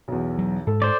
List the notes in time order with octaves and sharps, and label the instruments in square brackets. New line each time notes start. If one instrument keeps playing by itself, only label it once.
[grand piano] B1 E2
[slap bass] F#3
[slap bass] G#2 [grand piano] A4
[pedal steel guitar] C5 D5